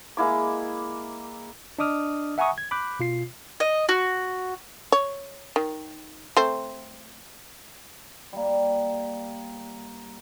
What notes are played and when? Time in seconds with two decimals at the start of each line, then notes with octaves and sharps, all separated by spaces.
0.17 G#3 A#3 E4 D6
1.79 D4 D#5 D6 D#6 F6
2.38 E5 F#5 G#5 A#5 C#6 D#6
2.58 G#6
2.71 B5 D6 F#6 G6
2.99 B2 F4 C7
3.60 D#5
3.89 F#4
4.92 C#5
5.56 D#3
6.37 A3 C4 C5
8.33 G3 A#3